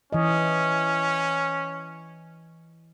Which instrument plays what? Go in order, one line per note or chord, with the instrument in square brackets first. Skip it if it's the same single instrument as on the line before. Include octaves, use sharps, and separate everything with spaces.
[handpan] E3 D#5 [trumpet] C#4